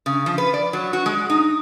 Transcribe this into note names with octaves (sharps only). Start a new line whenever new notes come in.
C#3
F3
B4
D5
F#3
F#4
G#3
D#4